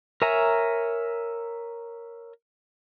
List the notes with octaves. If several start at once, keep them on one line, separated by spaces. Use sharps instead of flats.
A#4 C#5 E5 G#5 A#5